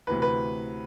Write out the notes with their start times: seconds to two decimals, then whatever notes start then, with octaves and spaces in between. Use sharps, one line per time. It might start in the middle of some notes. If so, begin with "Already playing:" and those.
0.07 D2 C3 E3 B4
0.22 B4